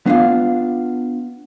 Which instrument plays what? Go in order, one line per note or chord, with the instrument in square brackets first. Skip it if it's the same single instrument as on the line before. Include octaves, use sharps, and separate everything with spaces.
[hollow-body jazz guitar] B3 D4 F4 F5